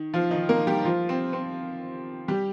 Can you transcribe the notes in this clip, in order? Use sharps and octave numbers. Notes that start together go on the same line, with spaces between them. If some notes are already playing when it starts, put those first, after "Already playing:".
Already playing: D#3
F3 F4
D#3 D#4
A#3 A#4
G3 G4
F3 F4
C4
C4
G3 G4